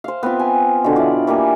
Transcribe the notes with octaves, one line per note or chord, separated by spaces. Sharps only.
C5 F5
B3 C4 F4
G#5
B2 D3
E4 F4 D5
G3 A#3 G4 G#5